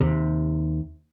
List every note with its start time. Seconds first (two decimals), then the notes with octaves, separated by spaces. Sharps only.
0.01 D#2 C3